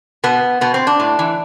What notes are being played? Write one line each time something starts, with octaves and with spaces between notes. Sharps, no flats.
B2 B3
B2 B3
C4
D4
A2
E3